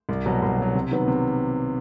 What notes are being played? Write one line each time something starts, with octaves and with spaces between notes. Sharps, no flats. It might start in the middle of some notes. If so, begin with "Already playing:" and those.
C2
B2 F#3
C2
B2 F#3
C3
D#3 F#3 B3
C3